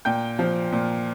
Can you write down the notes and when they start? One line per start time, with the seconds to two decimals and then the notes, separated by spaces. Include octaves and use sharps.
0.05 A#2 G5 G6
0.39 F3
0.72 A#2